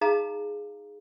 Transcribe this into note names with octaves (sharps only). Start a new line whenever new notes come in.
D#4 G#4 D#5 F5 A#5